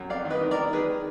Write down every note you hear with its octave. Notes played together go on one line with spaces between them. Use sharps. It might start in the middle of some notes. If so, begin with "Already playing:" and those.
Already playing: F#2
F2 D5 F5
D#3
B4 D#5
D#3
A#4 D5
D#3
D#3 G#4 B4
D#3